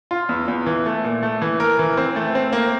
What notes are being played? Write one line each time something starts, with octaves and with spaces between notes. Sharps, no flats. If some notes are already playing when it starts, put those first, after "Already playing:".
F4
E2
E2
E3
A3
A#2
A3
E3
A#4
E3
C4
A3
C4
A#3